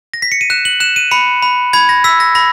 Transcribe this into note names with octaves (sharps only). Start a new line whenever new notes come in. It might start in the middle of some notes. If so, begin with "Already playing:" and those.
A#6
B6
C#7
D#7
F#6 E7
F#7
F#6 E7
D#7
B5 C#7
B5
B5 G#6
A#6
E6 B6
A#6
B5 A#6